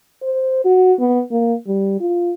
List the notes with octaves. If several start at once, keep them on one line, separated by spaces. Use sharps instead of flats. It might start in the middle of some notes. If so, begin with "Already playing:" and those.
C5
F#4
B3
A#3
G3
F4